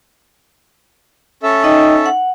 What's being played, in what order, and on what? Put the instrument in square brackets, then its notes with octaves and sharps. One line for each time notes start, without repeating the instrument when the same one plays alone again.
[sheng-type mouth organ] C#4 A4 E5
[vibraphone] D#4 D#5 G5
F#5